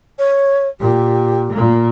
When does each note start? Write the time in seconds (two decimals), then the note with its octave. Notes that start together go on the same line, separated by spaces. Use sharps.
0.18 C#5
0.80 A#2 G4
1.52 A#2 A#3